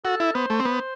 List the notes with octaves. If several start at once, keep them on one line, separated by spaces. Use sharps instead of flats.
F#4 A4
E4
B3 C5
A3
C4
B3